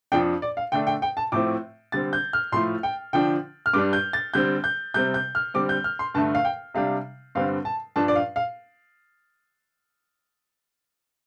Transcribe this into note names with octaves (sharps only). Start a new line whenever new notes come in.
F2 F3 D4 G5
D5
F5
D3 A3 D4 G5
G5
G5
A5
A2 F3 A3 C4 D6
D3 G3 C4 A6
G6
F6
A2 F3 A3 C6
G5
D3 F3 D4 G5
F6
G2 G3 D4 D6
G6
A6
D3 G3 C4 G6
G6
C3 G3 C4 G6
G6
F6
D3 G3 C4 D6
G6
F6
C6
G2 D3 A3 A5
F5
G5
C3 G3 D4 F5
G2 D3 G3 C4 F5
A5
G2 F3 D4 A5
D5
F5
F5